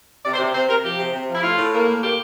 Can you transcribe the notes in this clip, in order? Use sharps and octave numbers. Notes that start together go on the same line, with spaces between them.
C3 D5
C5
C3 D5
C3 C5
C3 A#4
F3 G4
C3
C3
F3 E4
A2 F4
A2
A#3
A2
A#3 G4